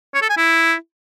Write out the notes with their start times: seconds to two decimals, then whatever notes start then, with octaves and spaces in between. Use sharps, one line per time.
0.15 C#5
0.22 A4
0.30 G#5
0.37 E4